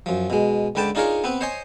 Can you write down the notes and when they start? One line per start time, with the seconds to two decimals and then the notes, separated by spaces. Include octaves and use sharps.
0.06 F#2 F3
0.30 B2 G#3
0.75 C#2 D3 B4 G5 A5 D6
0.95 D4 D#4 F4 G#4 A#4 C#5
1.24 B3 C4 B4
1.41 C5 C#5 D#5 G#5 C6